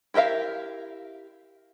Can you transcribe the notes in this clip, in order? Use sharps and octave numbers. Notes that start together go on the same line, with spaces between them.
E4 G4 A#4 E5 F5